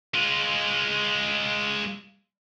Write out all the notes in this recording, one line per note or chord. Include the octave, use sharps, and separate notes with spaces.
G#3 F4